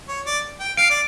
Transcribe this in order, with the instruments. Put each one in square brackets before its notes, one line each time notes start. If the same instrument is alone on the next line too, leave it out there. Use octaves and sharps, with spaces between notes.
[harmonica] C#5
D5
G5
[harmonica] F5 [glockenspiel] D7
[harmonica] D5